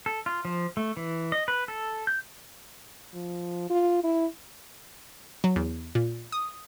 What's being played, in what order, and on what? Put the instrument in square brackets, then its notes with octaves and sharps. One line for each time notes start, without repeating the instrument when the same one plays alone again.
[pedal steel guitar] A4
F4
F3
A3
E3
D#5
B4
A4
G6
[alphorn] F3
F4
E4
[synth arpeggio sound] F#3
E2
A#2
D#6